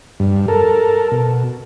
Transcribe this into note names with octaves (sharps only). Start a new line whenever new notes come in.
G2
A4 A#4
B2